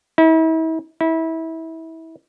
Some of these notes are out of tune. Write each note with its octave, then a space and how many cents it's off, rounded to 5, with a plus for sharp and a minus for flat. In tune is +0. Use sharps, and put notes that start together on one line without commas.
E4 -40
E4 -25